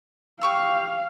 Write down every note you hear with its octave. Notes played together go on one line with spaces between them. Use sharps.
G4 F5 C#6 E6